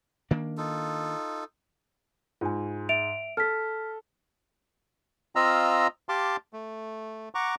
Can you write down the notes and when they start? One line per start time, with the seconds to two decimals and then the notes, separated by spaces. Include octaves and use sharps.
0.31 D#3 A#3 D4
0.58 D#4 F4 A4
2.41 G#2 F4 G#5
2.89 E5 D7 F7
3.37 A4 F6 B6
5.36 C4 F4 D#5 F5 A#5 E6
6.09 G4 F5 A5 C6 D6
6.53 A3
7.35 F#5 A#5 C#6 D6